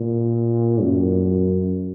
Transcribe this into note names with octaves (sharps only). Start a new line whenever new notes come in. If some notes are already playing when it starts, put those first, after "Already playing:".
Already playing: A#2
F#2